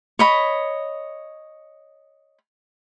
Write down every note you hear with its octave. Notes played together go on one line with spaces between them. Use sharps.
C#5 D#5 B5